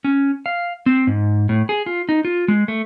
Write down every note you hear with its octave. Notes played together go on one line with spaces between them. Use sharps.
C#4
F5
C4
G#2
A2
G#4
F4
D#4
F4
G#3
A3